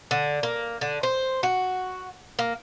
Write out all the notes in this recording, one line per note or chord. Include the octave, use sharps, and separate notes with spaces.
D3
A#3
D3
C5
F#4
A#3